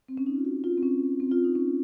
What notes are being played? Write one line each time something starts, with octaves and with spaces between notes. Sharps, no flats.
C4
C#4
D#4
F4
F#4
F4
C4
C#4
C4
F4
D#4
C#4